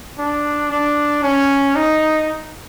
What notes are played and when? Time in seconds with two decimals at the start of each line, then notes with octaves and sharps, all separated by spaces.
0.18 D4
0.71 D4
1.23 C#4
1.75 D#4